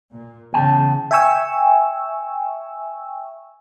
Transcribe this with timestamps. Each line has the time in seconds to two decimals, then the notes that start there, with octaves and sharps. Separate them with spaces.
0.11 A#2
0.53 E2 C#3 G5 A5
1.11 E5 G5 G#5 C#6 E6